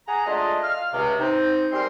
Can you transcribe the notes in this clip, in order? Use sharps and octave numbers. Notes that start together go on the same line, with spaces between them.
G#4 F#5 G#5 A#5
G#3 A3 D4 F4 D#5
F5 F6
C#2 C3
C4 D#4
G3 G#3 C4 A#4 C6